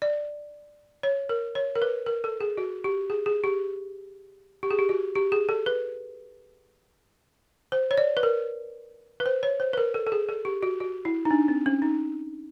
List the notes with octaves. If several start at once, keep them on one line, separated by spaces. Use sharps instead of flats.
D5
C#5
A#4
C#5
A#4
B4
A#4
A4
G#4
F#4
G4
G#4
G#4
G4
G4
G#4
G4
F#4
G4
G#4
A4
B4
C5
C#5
D5
B4
A#4
B4
C5
C#5
C5
B4
A#4
A4
A4
G#4
A4
G4
F#4
F#4
E4
D#4
D4
C4
C#4
D#4